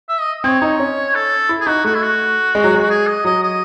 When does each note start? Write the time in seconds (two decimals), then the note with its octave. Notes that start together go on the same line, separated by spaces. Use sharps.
0.09 E5
0.20 D#5
0.44 C4 C#5
0.62 D#4
0.80 C#4
1.15 A4
1.49 E4
1.61 G#4
1.67 D#4 F#4
1.84 A3 F#4
1.94 E4
2.02 F#4
2.55 G#3
2.64 F#3
2.74 G#3
2.90 G#4
3.07 D#5
3.25 F#3 D#5
3.43 D#5